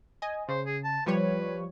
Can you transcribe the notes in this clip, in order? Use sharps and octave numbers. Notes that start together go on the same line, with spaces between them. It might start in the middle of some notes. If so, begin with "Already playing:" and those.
D#5 G#5
C#3 C5
G#4
A5
F3 G3 B4 C#5